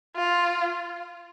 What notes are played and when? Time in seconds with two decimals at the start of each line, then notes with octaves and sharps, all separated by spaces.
0.16 F4